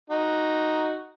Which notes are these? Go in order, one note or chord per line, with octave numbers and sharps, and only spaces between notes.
D#4 F#4